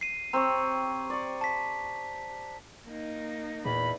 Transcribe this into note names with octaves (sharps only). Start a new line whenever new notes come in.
C7 D#7
C4 G4 C#5 A#5
D5 C#6
A5 B6
A#3 D#4
E2 A#2 B5